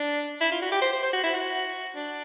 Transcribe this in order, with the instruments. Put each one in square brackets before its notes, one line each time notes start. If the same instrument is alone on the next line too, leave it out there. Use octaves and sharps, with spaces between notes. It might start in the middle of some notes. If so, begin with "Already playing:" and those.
Already playing: [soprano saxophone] D4
E4
F4
F#4
G4
C5
C5
C5
F#4
E4
F#4
D4